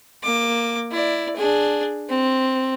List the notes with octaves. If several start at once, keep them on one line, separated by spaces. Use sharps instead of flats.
A#3 D6
E4 D5
D4 G#4
C4